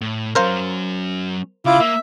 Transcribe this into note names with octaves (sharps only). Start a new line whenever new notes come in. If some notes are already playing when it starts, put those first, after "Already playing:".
A2
F#3 C#4 A#4 C5 F5
C#3 E4 F4 D6
A#3 E5